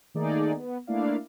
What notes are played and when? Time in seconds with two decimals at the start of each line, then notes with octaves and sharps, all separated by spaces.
0.14 D#3 A3 A#3 D#4 G#4 D5
0.54 B3
0.87 A3 A#3 D4 E4 D5 F5